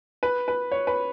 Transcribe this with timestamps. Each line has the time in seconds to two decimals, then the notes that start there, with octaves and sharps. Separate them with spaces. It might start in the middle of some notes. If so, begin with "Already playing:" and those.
0.23 B4
0.48 B4
0.72 C#5
0.87 B4